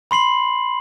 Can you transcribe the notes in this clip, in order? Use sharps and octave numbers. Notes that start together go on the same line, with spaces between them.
B5 C6 C7 F#7